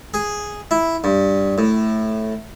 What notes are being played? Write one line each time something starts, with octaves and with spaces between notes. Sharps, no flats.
G#4
E4
G2
A2